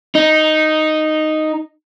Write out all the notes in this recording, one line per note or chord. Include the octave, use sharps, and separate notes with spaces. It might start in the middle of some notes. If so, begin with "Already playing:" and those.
D#4